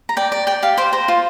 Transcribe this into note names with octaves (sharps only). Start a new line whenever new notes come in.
A#5
D5 G5
D5
D5 G5
G4 F5
C5 G5
C5 A#5
F4